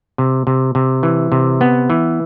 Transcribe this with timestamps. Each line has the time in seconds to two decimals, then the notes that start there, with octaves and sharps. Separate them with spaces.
0.18 C3
0.47 C3
0.75 C3
1.03 E3
1.32 C3
1.61 B3
1.90 E3